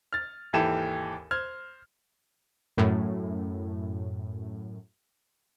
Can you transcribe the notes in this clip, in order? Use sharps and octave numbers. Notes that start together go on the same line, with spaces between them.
F6 A6
G#1 D#2 E3 G4 A4 E7
C5 F6 G#6
F#2 A2